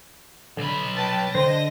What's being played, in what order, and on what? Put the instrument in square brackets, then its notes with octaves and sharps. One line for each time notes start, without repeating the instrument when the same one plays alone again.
[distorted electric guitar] B1 B5 [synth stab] D3
[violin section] B4 G5 A5 [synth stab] A6
[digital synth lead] D3 [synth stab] C5 [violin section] D#5 A#6